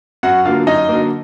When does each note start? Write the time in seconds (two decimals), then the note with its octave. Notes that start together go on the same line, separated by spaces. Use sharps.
0.23 F#2 F#4 F#5
0.45 D3 F#3 A#3 F4 F5
0.67 F#2 D#4 D#5
0.89 D3 F#3 A#3